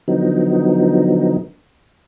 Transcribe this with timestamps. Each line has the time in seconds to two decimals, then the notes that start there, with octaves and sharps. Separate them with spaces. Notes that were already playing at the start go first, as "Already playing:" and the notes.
0.08 D3 F3 F#3 B3 D#4